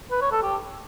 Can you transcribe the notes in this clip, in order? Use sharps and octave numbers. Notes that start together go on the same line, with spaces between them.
B4
C#5
A4
G4